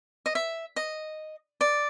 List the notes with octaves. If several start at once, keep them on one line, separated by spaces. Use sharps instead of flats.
D#5
E5
D#5
D5